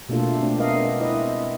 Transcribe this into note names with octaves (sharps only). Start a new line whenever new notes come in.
B2 A3 A#3 D4 F4 A4
A3 C4 D4
G#3 B3 D4 A#4 D#5 F5
C4 E4 B4 D#5 E5